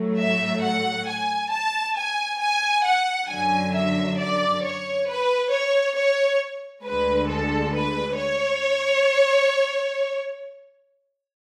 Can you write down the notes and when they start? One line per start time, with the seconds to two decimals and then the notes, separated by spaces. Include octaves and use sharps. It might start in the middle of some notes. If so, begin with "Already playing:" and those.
Already playing: A2 F#3 A3
0.19 E5
0.63 F#5
1.08 G#5
1.52 A5
1.97 G#5
2.41 G#5
2.85 F#5
3.30 F#2 D3 F#3 G#5
3.75 E5
4.20 D5
4.64 C#5
5.08 B4
5.52 C#5
5.96 C#5
6.85 D2 D3 G#3 B4
7.30 A4
7.74 B4
8.18 C#5